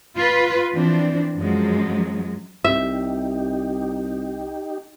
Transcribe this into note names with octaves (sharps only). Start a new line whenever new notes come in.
F4 B4
E3 F3 C4 D4
F#2 F3 F#3 G#3
C2 D#4 G4 E5